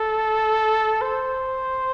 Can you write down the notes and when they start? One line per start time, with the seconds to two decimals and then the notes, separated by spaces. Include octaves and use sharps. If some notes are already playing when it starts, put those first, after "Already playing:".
Already playing: A4
1.01 C5